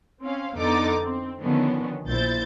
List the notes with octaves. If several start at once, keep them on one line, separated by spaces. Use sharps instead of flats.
C4 C#4 F5
F2 D3 B3 D#4 D6 A6
C4
D3 D#3 F3 B3 C#4
A#1 A#2 E4 C5 G6 A6